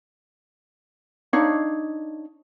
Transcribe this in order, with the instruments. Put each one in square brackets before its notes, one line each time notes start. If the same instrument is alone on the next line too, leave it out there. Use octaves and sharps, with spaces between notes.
[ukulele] D4 D#4 C#5 F5